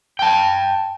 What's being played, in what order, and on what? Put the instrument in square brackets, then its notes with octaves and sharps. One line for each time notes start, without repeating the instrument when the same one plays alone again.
[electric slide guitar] G5 A5